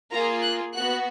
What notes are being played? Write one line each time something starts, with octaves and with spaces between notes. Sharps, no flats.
A#3 F4 G#4 A#5
F#6
B3 F#4 F#6